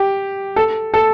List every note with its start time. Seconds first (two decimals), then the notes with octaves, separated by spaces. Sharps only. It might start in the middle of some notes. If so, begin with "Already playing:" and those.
Already playing: G4
0.56 A4
0.94 A4